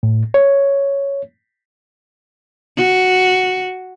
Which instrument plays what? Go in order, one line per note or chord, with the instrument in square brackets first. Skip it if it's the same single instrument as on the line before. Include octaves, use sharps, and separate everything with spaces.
[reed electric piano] A2
C#5
[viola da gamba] F#4